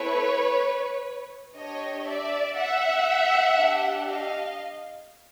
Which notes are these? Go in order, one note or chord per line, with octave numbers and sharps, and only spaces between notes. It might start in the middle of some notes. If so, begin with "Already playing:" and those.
Already playing: A3 C4 E4 A4 B4 C#5
D4 G4 C#5 D#5
D5 E5
E5 F#5
D4 G4
D#5 F5